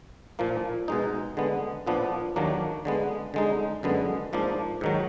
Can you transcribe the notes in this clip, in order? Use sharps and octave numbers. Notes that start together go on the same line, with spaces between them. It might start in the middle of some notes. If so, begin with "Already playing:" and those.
A#2 F3 A#3
B2 G#3 D#4
D3 G#3 B3
A#2 F3 B3 D4
D#2 D#3 F#3 A#3 D4
D3 G#3 B3
D3 G#3 D#4
F#2 D3 G#3 B3
G#2 F3 A#3 D4
G#2 D#3 F#3